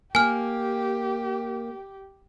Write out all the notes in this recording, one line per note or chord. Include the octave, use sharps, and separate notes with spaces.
A#3 G4 G#5 F6